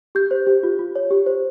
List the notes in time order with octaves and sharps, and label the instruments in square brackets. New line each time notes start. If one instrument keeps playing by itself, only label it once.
[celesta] G4 G6
C5
G4
F4
F4
C#5
G4
C5